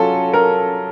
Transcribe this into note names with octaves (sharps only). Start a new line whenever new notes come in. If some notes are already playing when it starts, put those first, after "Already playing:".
Already playing: F#3 C#4 F4 A4
A#4